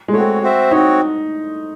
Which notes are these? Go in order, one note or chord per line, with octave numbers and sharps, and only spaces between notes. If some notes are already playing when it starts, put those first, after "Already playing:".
G#3
A3 C4 F#4 C#5
C4 F#4 C5 E5
C4 D#4 F#4 C#5